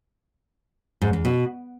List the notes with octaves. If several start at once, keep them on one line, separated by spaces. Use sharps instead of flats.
G#2
E2
B2